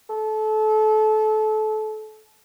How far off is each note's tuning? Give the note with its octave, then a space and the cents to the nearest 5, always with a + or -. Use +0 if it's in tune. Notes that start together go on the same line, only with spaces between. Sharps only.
A4 -25